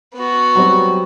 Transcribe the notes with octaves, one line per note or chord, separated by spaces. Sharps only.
B3 F#4
F#3 G3 C4